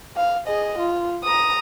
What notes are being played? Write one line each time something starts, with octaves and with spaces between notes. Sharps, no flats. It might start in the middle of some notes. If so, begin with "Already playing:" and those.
F5
G#4 D#5
F4
A#5 D#6